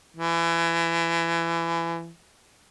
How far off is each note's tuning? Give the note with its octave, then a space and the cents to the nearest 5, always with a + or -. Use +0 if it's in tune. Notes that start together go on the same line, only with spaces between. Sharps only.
E3 +25